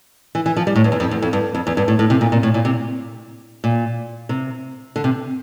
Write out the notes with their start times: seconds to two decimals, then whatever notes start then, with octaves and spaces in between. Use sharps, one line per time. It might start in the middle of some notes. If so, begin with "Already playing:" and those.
0.35 E3
0.46 E3
0.57 F3
0.67 G3
0.76 A2
0.84 G2
0.92 E2
1.00 F2
1.11 E2
1.22 F2
1.33 G2
1.55 F2
1.67 E2
1.77 G2
1.88 A2
1.99 A2
2.10 C3
2.21 A#2
2.32 A#2
2.43 A2
2.54 A#2
2.65 C3
3.64 A#2
4.29 C3
4.96 D3
5.04 C3